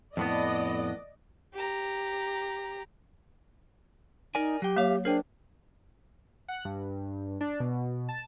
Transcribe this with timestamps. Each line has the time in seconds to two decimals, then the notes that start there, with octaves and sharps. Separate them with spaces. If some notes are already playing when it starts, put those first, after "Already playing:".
0.17 F2 A2 B3 D5 D#5
1.54 G4 A#5
4.35 D#4 A#4 D5 G#5
4.62 F#3 G4 G5
4.76 F#3 A#3 C#5 E5 F5
5.05 D4 G#4 A#4 C5 G5
6.48 F#5
6.65 G2
7.41 D4
7.60 B2
8.09 A5